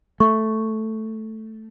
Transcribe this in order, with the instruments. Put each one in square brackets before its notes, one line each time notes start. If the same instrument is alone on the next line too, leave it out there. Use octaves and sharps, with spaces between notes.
[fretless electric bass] A3 [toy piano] C#6